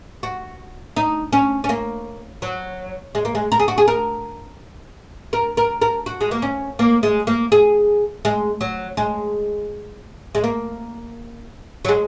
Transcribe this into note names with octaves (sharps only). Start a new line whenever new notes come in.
F#4
D#4
C#4
C#4
A#3
F#3
G#3
A#3
G#3
A#4
G#4
F#4
G#4
A#4
A#4
A#4
A#4
F#4
G#3
A#3
C#4
A#3
G#3
A#3
G#4
G#3
F#3
G#3
G#3
A#3
F#3
G#3